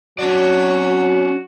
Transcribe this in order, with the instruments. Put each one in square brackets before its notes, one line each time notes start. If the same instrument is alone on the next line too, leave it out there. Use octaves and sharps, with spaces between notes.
[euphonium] F#3 [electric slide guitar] C#4 D4 D5 [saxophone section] F#4 [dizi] C#5